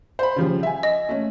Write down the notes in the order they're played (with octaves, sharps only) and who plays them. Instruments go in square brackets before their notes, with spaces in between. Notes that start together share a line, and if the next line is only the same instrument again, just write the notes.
[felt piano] C5 B5
C#3 F3 G3
E5 G#5
[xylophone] D#5
[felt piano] A3 C#4